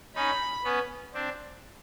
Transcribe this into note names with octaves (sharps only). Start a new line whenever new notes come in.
C#4 D#4 B5
B3 C#4
C4 D4